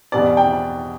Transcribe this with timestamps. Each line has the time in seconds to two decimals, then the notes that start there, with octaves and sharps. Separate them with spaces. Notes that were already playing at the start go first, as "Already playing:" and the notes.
0.12 E2 B2 G3 D5
0.37 G5